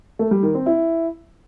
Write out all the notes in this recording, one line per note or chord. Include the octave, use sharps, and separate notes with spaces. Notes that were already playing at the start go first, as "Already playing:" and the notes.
A3
G3
D#3
C4
E4